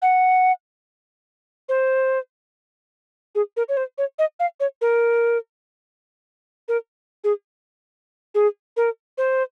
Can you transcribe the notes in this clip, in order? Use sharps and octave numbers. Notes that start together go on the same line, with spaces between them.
F#5
C5
G#4
A#4
C#5
C5
C#5
D#5
F5
C#5
A#4
A#4
G#4
G#4
A#4
C5